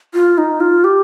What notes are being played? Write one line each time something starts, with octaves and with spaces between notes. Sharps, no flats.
F4
D#4
F4
G4